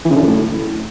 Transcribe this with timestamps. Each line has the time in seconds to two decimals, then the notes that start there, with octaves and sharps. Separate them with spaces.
0.05 E3
0.10 C#3
0.16 D3
0.21 F#2
0.27 A2